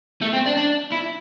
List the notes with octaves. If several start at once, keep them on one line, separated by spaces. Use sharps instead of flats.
A3
C4
D4
D4
E4